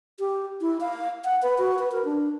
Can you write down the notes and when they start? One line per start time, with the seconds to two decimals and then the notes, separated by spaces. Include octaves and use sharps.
0.19 G4
0.61 E4
0.80 F5
1.24 F#5
1.43 B4
1.58 F#4
1.79 B4
1.92 A#4
2.05 D4